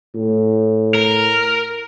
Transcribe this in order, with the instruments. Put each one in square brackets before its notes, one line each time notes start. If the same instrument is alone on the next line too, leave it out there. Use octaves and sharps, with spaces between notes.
[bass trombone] A2
[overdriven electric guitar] A#4